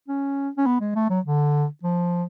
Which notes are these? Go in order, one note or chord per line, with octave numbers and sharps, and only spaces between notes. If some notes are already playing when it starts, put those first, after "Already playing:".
C#4
C#4
B3
G#3
A3
F#3
D3
F3